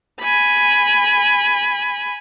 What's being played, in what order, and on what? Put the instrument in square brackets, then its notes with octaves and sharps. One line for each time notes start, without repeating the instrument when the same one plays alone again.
[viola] G#5 B5